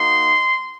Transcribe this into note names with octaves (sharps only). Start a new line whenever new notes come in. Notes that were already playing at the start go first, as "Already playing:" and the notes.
Already playing: A#3 D#4 F#4 C6